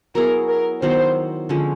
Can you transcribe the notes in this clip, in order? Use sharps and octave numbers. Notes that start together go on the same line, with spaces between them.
F#3 B3 E4 G#4 A#4
A#4
D#3 F#3 B3 E4 C5
D3 F3 G#3 C#4